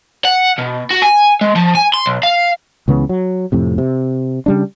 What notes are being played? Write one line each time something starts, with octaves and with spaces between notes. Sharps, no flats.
F#5
B2
F#4
G#5
G#3
F3
G#5
C6
B1
F5
C#2 C#3 E3 B3
F#3
F2 A2 C3
C3
C#3 G3 D4